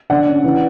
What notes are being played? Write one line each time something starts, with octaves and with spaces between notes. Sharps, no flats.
D3 D5 F#5
C#4
E3